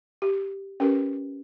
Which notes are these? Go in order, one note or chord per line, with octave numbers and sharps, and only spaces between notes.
G4
C#4 G4 A#4 B4